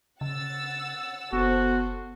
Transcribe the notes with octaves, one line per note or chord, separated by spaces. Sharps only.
C#3 F#5 E6 A6
F#1 B3 F#4 A4 C5